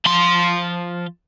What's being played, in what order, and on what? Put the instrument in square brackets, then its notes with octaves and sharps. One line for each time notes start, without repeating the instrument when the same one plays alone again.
[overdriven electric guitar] F3 C6